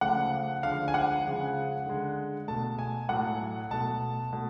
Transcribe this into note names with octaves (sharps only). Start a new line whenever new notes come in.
C#3 F3 A3 F#5
D3 F3 G#3 F5
G#5
F#5
C#3 F3 G#3
D3 G#3
B2 A3 A5
G#5
A2 F#3 A3 F#5
B2 A3 A5
B2 A3